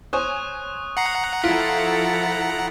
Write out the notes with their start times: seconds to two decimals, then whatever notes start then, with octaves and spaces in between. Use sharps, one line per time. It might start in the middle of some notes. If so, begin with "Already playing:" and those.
0.13 C5 C#5 G#5 C#6 D#6 F#6
0.97 F#5 A#5 C7 C#7
1.44 F3 E4 F4 A4 B6 D7